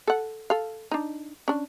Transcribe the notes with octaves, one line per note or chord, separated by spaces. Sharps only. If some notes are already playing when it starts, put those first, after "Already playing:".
A4 F#5
A4 F5
D4 D#4
C#4 D4